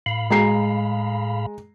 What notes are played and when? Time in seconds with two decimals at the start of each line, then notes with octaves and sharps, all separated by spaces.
0.06 A2 F5 B5
0.30 G#3 A#5 C7